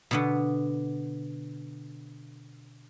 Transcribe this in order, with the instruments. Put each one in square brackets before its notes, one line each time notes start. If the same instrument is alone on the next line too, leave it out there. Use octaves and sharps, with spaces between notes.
[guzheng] B2 D3 B3